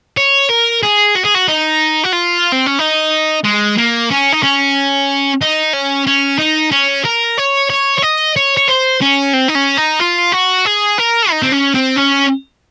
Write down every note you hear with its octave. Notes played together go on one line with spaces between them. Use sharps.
C#5
A#4
G#4
F#4
G#4
F#4
D#4
F#4
F4
C4
C#4
D#4
G#3
A#3
C#4
D#4
C#4
D#4
C#4
C#4
D#4
C#4
A#4
C#5
C#5
C#5
D#5
C#5
C#5
C5
C#4
C4
D#4
C#4
D#4
F4
F#4
G#4
A#4
D#4
C4
C#4
C4
C#4